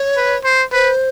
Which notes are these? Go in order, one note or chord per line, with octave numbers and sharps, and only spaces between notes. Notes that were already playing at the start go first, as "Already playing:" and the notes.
Already playing: C#5
B4
C5
B4 C5